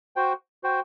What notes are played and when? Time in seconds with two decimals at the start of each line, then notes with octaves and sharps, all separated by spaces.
0.16 F#4 C5 G5
0.63 F#4 C5 G5